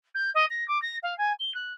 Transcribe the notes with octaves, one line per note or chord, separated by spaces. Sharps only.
G6
D#5
A#6
D6
A#6
F5
G#5
G7
F#6